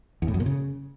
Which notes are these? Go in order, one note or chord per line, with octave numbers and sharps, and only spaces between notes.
E2
A2
F#2
A#2
C#3